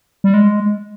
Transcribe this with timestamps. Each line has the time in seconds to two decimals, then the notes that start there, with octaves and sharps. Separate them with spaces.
0.24 G3
0.34 G#3